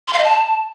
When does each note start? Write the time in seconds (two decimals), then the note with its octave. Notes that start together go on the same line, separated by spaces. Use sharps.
0.08 C6
0.13 F5
0.18 D#5
0.24 A5